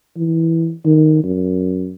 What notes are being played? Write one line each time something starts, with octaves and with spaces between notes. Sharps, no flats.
E3
D#3
F#2